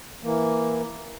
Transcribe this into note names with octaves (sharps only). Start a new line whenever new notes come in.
E3 A#3